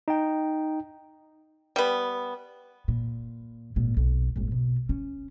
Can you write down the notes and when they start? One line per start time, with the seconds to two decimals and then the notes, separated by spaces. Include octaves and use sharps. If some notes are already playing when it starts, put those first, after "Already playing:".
0.08 D#4 G5
1.76 G3 B3
2.88 A#2
3.76 G#1 A#2
3.97 B1
4.36 D#1 G#1
4.52 B2
4.89 C#4